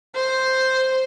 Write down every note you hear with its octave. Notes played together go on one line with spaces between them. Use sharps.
C5